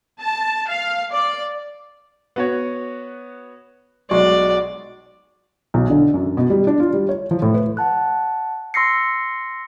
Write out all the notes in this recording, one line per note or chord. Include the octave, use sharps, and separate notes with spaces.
A5
F5
D5
B3 F#4 C#5
B1 G#3 F#4 D5 C#6
B1
D3
F#2
B2
G3
D4
F4
G3
C#5
F3
A2
B4
F#5 A5 F#6
C6 E6 A#6 C7 C#7